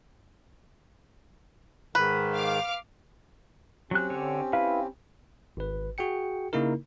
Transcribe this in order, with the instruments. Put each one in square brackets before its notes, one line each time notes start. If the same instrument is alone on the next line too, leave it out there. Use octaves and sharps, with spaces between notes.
[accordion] G#2 D#3 [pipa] B4
[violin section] F5 D6 F6
[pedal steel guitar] F#3 F#6 [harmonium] C4 C#4 G4
[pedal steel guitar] D3 C#5
[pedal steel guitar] E4 B4 [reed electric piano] F5
[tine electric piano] G#1 B4
F#4 G#4 G5 C#7
C#3 A#3 D#4 E4 A#4